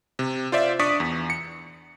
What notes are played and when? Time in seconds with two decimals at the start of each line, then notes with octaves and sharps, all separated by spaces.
0.19 C3
0.52 F4 C5 D5 E5
0.79 D4 D5 C#6 D#6 B6
1.00 E2
1.30 C#7